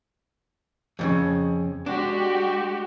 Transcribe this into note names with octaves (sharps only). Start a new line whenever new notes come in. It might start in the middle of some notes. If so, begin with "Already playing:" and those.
F2 A2 C#3
G#3 D4 F#4 G4